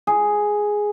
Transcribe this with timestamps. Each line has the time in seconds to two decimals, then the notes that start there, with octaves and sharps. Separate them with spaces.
0.07 G#4